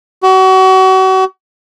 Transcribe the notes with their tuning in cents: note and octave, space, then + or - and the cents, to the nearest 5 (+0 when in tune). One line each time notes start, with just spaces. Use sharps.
F#4 +35